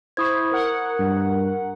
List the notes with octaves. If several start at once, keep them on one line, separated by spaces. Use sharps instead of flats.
E4 C5 C#6 D#6 G#6
A#4 F#5
G2